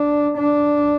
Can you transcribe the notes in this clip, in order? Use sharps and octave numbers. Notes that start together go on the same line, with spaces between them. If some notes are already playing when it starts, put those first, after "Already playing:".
Already playing: D4
D4